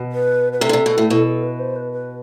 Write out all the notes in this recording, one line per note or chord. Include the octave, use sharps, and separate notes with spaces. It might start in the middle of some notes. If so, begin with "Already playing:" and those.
Already playing: B2
B4
B4
C3 A4
D3
C3
B2
A2
B2 A4
A4
B4
C5
B4
B4